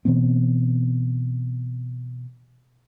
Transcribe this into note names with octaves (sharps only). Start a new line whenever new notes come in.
B2 E3 B3 C4